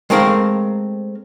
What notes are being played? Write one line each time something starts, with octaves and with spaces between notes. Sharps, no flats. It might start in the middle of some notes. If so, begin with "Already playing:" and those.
G#3 A3 C4 A#4 C5 F5